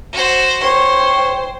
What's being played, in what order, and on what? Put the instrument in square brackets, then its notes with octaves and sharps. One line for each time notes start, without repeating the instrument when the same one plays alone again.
[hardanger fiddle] F#4 C5
[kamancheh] C5 G5 [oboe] C#5 [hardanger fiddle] C6